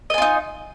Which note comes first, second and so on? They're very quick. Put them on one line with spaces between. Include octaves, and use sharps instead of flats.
D#5 G#5 F4 D#4